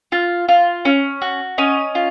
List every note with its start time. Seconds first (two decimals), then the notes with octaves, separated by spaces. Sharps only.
0.12 F4
0.49 F4
0.85 C#4
1.22 F#4
1.58 C#4 D#5
1.95 F4